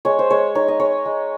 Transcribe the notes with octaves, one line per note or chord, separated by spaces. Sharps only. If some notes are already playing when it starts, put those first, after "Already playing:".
G#3 C#5
C5
G#3 C#5
D#4 C#5
D#5
G#3 C#5
G#3